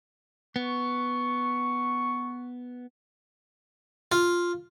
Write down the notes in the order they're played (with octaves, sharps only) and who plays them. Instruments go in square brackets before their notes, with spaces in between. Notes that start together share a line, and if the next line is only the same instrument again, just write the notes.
[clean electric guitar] B3 [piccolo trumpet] C#6
[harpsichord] F4